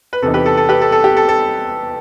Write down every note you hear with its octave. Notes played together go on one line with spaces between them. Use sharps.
B4
E2 C3 E3 B3 D#4 A4
G4 B4
A4
A4
G4 B4
A4
A4
G4
A4
A4